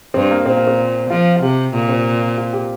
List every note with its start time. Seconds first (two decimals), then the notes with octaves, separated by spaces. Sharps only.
0.14 G2 C4
0.31 A#3
0.46 A#2 C4
0.57 A#3
0.67 C4
1.10 F3 F4
1.36 F4
1.42 C3 G4
1.74 A#2 F4
1.89 C4
2.38 F4
2.53 G4